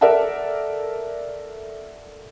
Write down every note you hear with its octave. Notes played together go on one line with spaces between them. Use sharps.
A4 A#4 D5 E5 F#5 A5